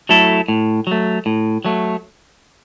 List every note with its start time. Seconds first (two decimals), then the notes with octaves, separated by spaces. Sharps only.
0.09 F#3 A3 E4 A4
0.48 A2
0.87 F#3 A3
1.26 A2
1.65 F#3 A3